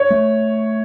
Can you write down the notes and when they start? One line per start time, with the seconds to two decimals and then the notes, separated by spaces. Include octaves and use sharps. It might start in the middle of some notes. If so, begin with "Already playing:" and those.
Already playing: C#5
0.11 A3